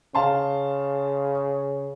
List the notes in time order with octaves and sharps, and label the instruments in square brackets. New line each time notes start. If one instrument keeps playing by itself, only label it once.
[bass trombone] C#3 [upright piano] F5 A5 C6